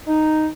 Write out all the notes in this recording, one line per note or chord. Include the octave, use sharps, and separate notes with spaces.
D#4